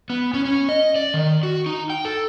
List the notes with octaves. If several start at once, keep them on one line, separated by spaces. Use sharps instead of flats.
B3
C#4
C#4
D#5
D5
D#3
F#4
D#4
G5
A4